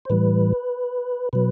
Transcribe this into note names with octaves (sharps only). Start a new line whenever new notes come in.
C5
A2 E3 G3 B4
B2 F#3 B4